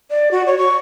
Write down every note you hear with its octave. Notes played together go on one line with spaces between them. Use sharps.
D5
F#4
C#5
C#6